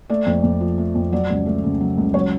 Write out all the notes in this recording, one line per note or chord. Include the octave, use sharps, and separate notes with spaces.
A3 D5
F2
F2
F3
A3
F2
F#3 D5
C#2
A3
C#3
F#3
C#2
F#3 C#5